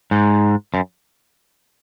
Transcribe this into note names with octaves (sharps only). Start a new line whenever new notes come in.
G#2
F#2